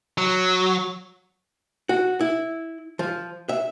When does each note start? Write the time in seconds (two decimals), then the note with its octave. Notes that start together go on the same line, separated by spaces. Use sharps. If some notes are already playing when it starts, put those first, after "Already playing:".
0.18 F#3
1.89 F#4
2.21 E4
2.99 F3
3.49 E5